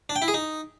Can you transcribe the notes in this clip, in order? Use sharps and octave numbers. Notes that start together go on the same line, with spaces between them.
D4
G5
E4
G#4
D#4